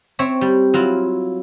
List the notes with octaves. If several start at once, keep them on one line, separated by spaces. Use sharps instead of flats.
C4 C#5 E5
G3
F#3 E4 F4